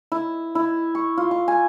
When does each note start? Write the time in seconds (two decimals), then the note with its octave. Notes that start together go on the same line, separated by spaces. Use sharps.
0.12 E4
0.55 E4
0.95 C#6
1.17 F4
1.31 C#6
1.48 G#5